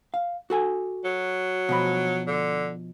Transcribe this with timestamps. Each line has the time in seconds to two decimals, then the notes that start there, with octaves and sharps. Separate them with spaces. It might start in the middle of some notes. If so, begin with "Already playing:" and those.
0.14 F5
0.50 F#4 A4 G#5
1.04 F#3
1.69 B2 F3 B5
2.27 D3